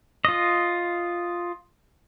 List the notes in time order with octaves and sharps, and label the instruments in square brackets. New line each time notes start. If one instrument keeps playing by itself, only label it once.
[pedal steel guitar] F4 D#5